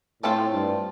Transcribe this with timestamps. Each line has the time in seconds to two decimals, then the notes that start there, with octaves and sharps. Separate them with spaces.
0.23 A2 A3 C4 F4 A4 C5
0.53 G2